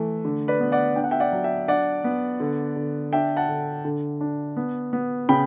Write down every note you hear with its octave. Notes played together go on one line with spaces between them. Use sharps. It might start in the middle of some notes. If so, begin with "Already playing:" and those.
Already playing: E3 A3
D3
B4 D5
B3
D5 F#5
D4 G5
F#5
E5 G5
D5 F#5
F#3
E5 G5
D4 D5 F#5
B3
D3
D3
D4 E5 G5
F#5 A5
D3
D3
D4
B3
B3
C#3 G5 B5